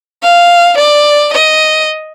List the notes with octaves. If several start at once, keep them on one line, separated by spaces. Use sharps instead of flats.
F5
D5
D#5